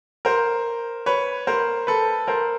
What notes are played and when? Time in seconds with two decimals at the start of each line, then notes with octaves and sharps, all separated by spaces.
0.25 A#4 C5
1.06 B4 C#5
1.47 A#4 C5
1.87 A4 B4
2.28 A#4 C5